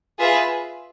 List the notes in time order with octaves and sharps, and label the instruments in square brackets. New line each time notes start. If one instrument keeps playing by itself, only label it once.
[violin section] F4 G#4 B4 E5